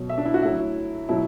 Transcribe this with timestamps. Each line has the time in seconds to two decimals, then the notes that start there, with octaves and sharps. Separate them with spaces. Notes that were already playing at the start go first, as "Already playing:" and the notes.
Already playing: B2 F#3
0.10 E5
0.18 D4
0.26 E4
0.34 F#4
0.42 A2 F#3 E4
1.09 B2 F#3 E4